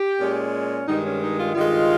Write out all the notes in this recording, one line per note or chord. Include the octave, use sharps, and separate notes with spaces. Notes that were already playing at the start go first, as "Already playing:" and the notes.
Already playing: G4
A#2 G#3 C#4
G2 D#3 G#3 D#4
C#4
D#4
F4
G2 D#3 G#3 F4